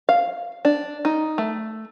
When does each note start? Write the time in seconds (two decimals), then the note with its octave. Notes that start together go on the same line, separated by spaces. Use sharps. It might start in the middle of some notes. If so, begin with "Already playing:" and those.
0.09 F5
0.65 D4
1.05 D#4
1.38 A3